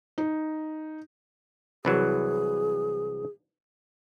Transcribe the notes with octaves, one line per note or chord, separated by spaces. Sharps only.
D#4
C2 E3 F#3 G#4